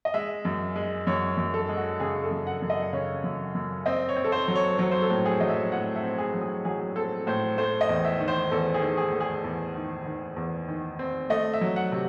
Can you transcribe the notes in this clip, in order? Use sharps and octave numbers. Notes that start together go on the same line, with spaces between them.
D#5
G#3 E5
F#2
G#3
F#2 C#5
F#2
A4
G#3
F#4
C#3 G#4
A4
F#2
F#5
F#2
D#5
C#3 C#5
F#2
F#2
C4 D#5
C#5
C4
A4
C5
F#3
C#5
F#3 C#5
C5
A4
A2
G#4
F#3 D#5
E5
A2 F#5
E5
C4
G#4
F#3
G#4
F#3 G#4
C4 A4
A2 C5
A3 C5
D#5
E2
E5
D#3
C5
E2 A4
G#4
D#3
G#4
A3
G#4
E2
D#3
D#3
E2
D#3
C4
A3 D#5
E5
F#3
F#5
C3